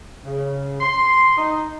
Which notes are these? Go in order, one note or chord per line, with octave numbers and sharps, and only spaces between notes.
C#3
C6
D#4